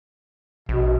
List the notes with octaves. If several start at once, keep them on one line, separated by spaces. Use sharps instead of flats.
A#1 B2